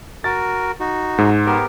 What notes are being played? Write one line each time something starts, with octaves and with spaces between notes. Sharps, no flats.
F#4 A#4 A6
D#4 F#4
G#2
B3 G4 A#4